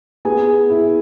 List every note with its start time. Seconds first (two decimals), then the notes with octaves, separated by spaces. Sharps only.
0.25 B3 G#4 G#5
0.70 E4